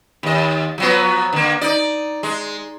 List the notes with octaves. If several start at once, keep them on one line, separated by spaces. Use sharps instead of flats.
D#2 D#5
F3 F#3 B3
D3 A#3
D#4 D5
G#3